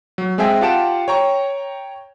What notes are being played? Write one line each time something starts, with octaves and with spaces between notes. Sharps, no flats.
F#3
G#3 C4 G#4 E5 G5 G#5
F4 G4 F#5 A5 D7 E7
C#5 G5 A#5 C#6